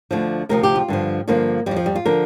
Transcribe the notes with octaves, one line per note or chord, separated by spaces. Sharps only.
D2 D3 F3
D2 C3 F3 A#4
G4
F4
G2 D3 F3
G2 D3 F3 A#3
F2 F3 G3
F3
G3
F4
D3 F3 A#4